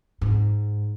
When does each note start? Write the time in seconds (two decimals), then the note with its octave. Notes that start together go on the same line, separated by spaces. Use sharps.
0.21 G#2